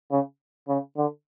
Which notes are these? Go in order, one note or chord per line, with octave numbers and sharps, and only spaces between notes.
C#3
C#3
D3